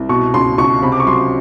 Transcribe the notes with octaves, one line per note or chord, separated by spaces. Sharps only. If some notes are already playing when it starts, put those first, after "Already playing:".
Already playing: C2
B2 C#6
C#2 C6
C#2 C#6
C3 B5
D6
C#6
F#3 C6